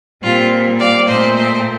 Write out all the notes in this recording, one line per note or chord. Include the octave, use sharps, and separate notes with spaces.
A#2 G3 C4 F4
D5 F5
A#2 A3 C4 C5 D#5
C5 D#5